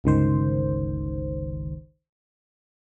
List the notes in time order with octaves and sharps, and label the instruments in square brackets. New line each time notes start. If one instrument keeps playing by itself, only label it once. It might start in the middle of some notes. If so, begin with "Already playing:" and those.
[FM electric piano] G1 C#2 D#3 C5